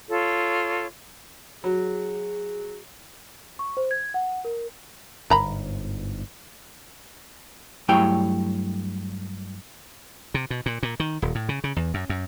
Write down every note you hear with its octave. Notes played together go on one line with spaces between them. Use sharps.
F4 A4 C#5
F#3 G#4
C#6
C5
G#6
F#5
A#4
G1 G#2 A#4 A#5 B5
G2 F#3 A3 E4 C#5 G5
C3
B2
A#2
A#2
D#3
D#1
A2
C#3
C#3
E2
F#2
F#2